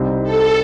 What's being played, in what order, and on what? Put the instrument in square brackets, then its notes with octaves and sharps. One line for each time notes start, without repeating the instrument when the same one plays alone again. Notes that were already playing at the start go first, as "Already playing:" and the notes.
Already playing: [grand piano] C2 C3 G3 C4 D#4
[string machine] A4